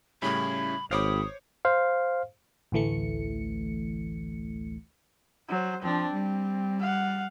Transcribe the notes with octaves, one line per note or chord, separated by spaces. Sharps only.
A2 C#3 G3 C#4 E4 B5
G#1 C5 C#5 F5 G5 B5 D6 D#6
C5 F5
A1 D2 E3 A3 C#7
F#3 C5
F3 C4 D4
G3
F5 F#5